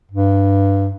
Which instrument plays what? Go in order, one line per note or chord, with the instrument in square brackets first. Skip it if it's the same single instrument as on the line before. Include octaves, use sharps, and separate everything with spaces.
[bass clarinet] G2